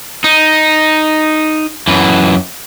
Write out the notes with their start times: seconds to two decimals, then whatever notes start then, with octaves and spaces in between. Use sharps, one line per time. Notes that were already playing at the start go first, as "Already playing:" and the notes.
0.24 D#4
1.88 F#2 E3